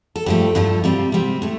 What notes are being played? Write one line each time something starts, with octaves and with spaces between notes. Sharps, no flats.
A4
G2 F3 A3 G4
G2 F3 A3 F4
C3 G3 C4
C3 G3 C4
A2 A3